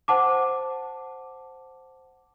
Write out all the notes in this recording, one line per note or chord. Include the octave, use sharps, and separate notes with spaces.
C5 F#5 A5 D6